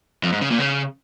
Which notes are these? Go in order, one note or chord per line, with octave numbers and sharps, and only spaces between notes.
F2
G#2
C#3
A#2
C#3